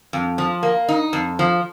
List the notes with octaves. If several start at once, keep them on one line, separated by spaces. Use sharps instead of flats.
F2
F3
A#3
D#4
F2
F3